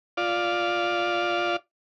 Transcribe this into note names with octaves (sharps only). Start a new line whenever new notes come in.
F4 D5